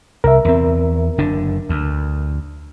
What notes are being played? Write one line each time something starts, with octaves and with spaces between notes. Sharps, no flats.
C2 A#4 E5
E2 C4
F#1 D3 D4
D2